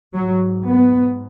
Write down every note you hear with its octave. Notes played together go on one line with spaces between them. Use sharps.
G#2 F#3
B3